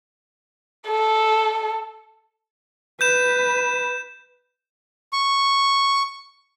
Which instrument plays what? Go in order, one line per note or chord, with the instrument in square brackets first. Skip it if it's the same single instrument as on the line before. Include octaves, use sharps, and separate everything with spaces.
[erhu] A4
[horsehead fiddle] B4 [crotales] G6 E7
[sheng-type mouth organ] C#6